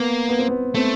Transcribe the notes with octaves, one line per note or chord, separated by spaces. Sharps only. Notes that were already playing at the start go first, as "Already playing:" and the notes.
Already playing: A#3 B3
B3
C4
B3
A3 C4